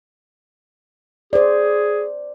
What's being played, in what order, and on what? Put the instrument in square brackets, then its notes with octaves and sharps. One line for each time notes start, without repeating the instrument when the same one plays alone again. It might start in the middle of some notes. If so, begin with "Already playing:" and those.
[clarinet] G#4 [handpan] C5 D5